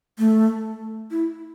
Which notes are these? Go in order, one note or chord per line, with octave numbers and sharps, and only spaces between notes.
A3
E4